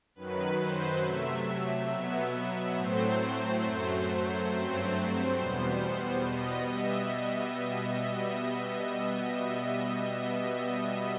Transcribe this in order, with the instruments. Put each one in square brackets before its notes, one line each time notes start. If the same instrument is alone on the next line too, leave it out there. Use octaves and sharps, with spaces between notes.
[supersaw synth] F#2 D#3 F#3 B4
C5
C3 F#3 A3 E5
B2 F#3 B3
A2 F#3 A3 C4 C5
F#2 F#3 A3
G2 F#3 A3 C4 C5
E2 B2 G3 B3
B2 G3 B3 D#5
E5